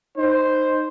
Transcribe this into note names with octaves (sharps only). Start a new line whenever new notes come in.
D#4 C5